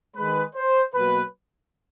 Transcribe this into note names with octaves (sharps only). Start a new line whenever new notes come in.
D#3 G#3 B4
C5
B2 F#3 A#3 B4